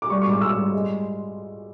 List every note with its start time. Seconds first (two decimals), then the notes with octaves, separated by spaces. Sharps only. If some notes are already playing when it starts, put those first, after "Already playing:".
0.02 D6
0.10 G3 C#6
0.21 C#6
0.26 G#2 D6
0.41 G#2 E6
0.57 G3
0.72 G#3